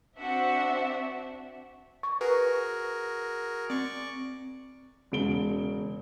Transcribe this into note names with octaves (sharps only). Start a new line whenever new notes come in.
C4 D4 F#4 E5 F#5
C#6
F#4 G#4 A#4 B4
C4 D5 C#6
E1 C#3 D7 G7